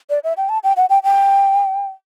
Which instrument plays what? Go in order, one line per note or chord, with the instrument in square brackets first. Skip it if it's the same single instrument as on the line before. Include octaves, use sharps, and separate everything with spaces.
[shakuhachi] D5
E5
G5
A5
G5
F#5
G5
G5